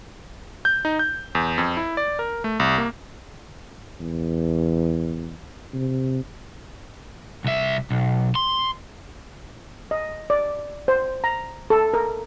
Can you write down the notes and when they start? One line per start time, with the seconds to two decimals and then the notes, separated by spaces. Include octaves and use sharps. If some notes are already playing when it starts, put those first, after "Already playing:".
0.65 G6
0.85 D#4
0.99 G6
1.35 E2
1.58 F2
1.77 E4
1.97 D5
2.19 A#4
2.44 A3
2.60 C2
2.78 A#3
4.00 E2
5.74 C3
7.45 C2 E5
7.91 B1
8.35 C6
9.91 D#5
10.30 D5
10.88 C5
11.24 A#5
11.70 A4
11.94 A#4